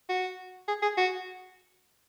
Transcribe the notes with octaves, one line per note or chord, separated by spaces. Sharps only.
F#4
G#4
G#4
F#4